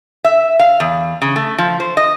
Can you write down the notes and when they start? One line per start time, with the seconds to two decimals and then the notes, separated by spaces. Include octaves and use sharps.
0.24 E5
0.59 F5
0.80 E2
1.22 C#3
1.36 A3
1.58 F3
1.80 C5
1.97 D#5